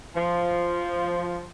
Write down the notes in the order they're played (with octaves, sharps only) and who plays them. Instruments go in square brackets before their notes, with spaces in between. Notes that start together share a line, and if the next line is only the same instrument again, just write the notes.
[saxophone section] F3